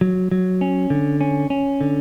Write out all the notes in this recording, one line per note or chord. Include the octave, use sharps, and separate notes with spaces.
F#3
F#3
C#4
D3
C#4
C#4
D3